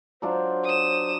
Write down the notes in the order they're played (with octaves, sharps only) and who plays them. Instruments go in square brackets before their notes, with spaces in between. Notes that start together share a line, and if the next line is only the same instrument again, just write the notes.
[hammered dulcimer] F#3 D4 F4 [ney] C5
[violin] D#6 E7